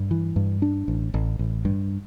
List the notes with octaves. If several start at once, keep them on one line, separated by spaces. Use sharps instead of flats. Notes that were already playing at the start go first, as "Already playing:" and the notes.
Already playing: G2
E3
G2
D4
A1
A1
A1
G2